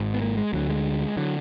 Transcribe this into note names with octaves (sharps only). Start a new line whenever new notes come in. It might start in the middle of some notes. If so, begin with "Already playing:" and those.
Already playing: G#1 G#2
B3
A#3
G#3
D2 D3 F#3
G#3
D3 F#3